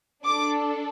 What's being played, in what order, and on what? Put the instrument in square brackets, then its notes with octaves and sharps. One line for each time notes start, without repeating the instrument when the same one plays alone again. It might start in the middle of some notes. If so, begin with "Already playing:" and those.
[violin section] D4 A4 D6